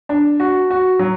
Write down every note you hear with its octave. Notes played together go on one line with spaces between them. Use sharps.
D4
F#4
F#4
F#3